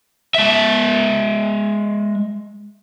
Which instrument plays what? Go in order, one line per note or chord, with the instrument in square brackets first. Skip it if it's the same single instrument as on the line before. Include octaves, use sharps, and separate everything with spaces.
[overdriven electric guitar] G#3 E5